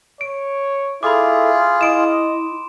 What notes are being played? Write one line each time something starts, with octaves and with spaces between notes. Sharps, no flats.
C#5 D7
E4 F4 G#4 A4 B5 D6
E4 D#5 C6 D7 E7